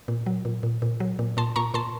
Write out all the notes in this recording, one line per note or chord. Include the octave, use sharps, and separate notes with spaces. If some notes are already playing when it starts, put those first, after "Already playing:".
A#2
F#3
A#2
A#2
A#2
F#3
A#2
A#2 A5 C6
A#2 A#5 C#6
A#2 A5 C6